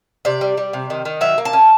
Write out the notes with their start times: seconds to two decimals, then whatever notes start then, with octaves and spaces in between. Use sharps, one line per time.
0.25 C3 D5
0.41 G3
0.57 G3
0.73 C3
0.90 D#3
1.05 D#3
1.21 F#3 E5
1.38 A#3
1.45 A5
1.53 C#4